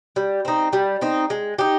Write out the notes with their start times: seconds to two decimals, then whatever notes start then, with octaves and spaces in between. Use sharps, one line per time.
0.16 G3
0.45 C4 D#4
0.73 G3
1.01 C4 D#4
1.30 G#3
1.58 D#4 G4